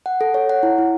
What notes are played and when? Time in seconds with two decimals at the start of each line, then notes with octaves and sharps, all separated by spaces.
0.06 F#5
0.21 A4
0.34 C#5
0.50 F#5
0.63 E4
0.78 E4